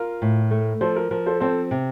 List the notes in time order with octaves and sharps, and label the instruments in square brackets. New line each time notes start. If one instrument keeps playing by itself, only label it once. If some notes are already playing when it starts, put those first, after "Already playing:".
Already playing: [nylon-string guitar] F4 [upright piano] A#4
[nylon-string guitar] A2
A3
[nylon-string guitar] F3 [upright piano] A4 C5
[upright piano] A#4
[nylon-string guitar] F3 [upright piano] A#4
[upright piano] A4 C5
[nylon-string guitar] C4 [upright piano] A4 C5
[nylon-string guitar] C3